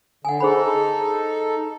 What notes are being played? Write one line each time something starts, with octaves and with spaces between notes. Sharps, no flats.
D3 F#5 G#5
D#4 G#4 A4 C5 B5